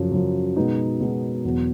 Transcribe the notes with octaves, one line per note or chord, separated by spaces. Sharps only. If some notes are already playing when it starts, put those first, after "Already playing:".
Already playing: F#2 C#3 F3
F#2 C#3 F3
B2 G#3 B3 D#4
B2 G#3 B3 D#4
E2 B2 F#3 B3